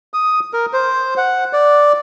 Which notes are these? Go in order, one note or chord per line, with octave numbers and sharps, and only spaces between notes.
D#6
A#4
C5
F#5
D5